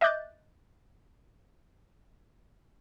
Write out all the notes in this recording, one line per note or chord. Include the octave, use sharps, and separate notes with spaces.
D#5 E5 D6 F#6 G6 A6